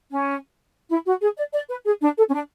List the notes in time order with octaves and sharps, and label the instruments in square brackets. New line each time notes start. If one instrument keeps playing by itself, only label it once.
[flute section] C#4
E4
F#4
G#4
D5
D5
B4
G#4
D4
A4
C#4
D4